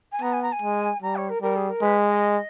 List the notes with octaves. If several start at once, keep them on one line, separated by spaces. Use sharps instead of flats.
G#5
B3 A#5
G#5
A#5
G#5
G#3
G3 A#5
C#5
A#4
G3 A#4
G#4
A#4
G#3 B4
D#5